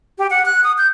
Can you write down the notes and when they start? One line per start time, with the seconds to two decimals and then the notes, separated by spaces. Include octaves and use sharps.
0.19 G4
0.30 F#5
0.46 F#6
0.64 D#6
0.78 G6